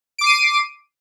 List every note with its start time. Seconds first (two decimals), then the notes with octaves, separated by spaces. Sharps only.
0.18 D7
0.21 D6
0.24 C7
0.26 D#7